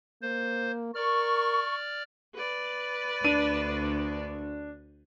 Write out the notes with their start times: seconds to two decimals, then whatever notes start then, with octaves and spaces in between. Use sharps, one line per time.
0.22 A#3 C5
0.95 A#4 D5 C#6 F6
2.35 B4 D5
3.24 D2 D4 D#7